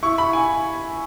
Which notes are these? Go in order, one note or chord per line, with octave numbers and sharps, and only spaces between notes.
E4 C#6
B5
E4 G#5